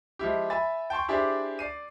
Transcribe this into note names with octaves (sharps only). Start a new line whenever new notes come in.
F3 G#3 E4 G4
E5 G#5 B5 A6
G5 A5 C6 C#6
D4 E4 G4 G#4 C5 D5
D5 C7 D#7